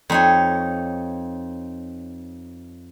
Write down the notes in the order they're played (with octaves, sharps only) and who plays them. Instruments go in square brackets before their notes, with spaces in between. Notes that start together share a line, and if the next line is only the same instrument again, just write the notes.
[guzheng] F2 D#4 C#5